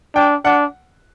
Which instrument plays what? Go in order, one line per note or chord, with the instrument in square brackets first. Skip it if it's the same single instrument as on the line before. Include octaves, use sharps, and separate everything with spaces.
[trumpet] D4 [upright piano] G5
[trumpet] D4 [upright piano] F#5